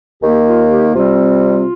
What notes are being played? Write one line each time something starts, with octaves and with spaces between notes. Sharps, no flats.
D#2 D#3 A#3 G4
F4
G4
C3 G3 C4 F4